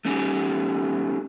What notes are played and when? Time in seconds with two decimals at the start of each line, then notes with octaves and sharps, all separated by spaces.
0.05 A3 C#4 D#4 G4